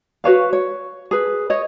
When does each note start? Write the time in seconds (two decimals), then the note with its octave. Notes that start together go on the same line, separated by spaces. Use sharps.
0.24 F#4 B4 C#5 F5
0.53 C#5
1.11 G#4 B4
1.50 C#5 D#5